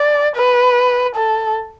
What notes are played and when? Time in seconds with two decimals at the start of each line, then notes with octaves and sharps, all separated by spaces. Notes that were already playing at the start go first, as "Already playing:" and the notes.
Already playing: D5
0.36 B4
1.16 A4